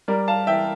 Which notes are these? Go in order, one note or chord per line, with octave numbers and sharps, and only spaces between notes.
G3 A#4 D5
F5 A5
E3 E5 G5